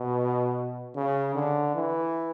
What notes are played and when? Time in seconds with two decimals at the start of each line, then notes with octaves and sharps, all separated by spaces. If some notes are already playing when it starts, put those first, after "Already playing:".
Already playing: B2
0.96 C#3
1.35 D3
1.75 E3